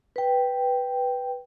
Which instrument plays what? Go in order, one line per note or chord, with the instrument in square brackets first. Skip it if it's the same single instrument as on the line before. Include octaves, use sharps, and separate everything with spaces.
[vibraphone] B4 G5